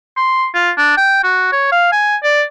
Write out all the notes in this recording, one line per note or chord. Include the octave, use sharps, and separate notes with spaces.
C6
F4
D4
G5
F#4
C#5
F5
G#5
D5